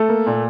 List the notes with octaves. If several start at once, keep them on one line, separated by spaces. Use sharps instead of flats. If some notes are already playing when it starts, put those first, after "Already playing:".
Already playing: A3 A4
A#3
A#2